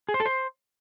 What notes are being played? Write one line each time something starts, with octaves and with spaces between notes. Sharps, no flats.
G#4
C5
A4
C5